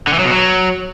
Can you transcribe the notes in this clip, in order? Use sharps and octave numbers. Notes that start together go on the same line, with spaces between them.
D3
E3
F#3
B2
F#3